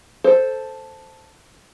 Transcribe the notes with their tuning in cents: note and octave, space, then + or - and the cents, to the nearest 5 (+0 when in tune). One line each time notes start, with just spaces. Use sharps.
A4 +0 C5 +0